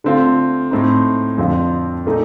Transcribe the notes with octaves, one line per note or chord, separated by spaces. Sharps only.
D3 A3 C4 F4
A2 A3 C4 D#4
F2 D3 F3 C4 F4
A#2 A3 D#4